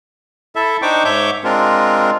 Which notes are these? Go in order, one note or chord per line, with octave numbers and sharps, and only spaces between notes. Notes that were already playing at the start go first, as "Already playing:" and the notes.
E4 A4 E5
D4 D#4 C5 G5 C#6 D6
G#2 C#5 E5 C#6 D6 G6
G#3 C4 D4 F4 A#4